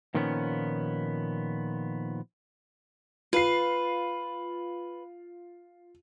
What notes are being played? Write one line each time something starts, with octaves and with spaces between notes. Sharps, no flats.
A#2 D#3 F3 A#3 B3 C#4
F4 B4 C7